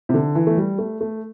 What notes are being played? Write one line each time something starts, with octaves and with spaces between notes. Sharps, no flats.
C3
D3
E3
A3
G3
A3
A3